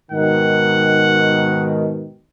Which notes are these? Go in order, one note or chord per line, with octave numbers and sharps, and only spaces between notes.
G#2 B2 D#3 F#5